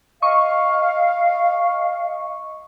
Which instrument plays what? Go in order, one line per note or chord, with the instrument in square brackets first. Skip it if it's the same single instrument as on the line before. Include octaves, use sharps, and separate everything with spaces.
[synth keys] D#5 C#6 [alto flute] F5